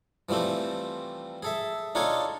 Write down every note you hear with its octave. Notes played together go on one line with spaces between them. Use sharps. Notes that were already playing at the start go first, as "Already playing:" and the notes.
E3 F3 G3 A3 C4
G#4 A4 E5
D4 D#4 F4 A4 C#5 G#5